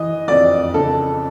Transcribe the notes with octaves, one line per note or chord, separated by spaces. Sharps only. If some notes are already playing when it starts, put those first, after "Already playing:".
Already playing: E3 D#5
F2 D5
C#3 A4